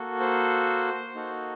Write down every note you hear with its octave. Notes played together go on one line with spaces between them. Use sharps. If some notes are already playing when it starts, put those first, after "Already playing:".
Already playing: A#3 F#4 A4
C5
A#3 D#4 F#4 A4